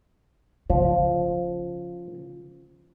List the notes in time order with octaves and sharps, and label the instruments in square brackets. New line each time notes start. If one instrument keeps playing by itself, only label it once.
[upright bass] C#3 [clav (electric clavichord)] F3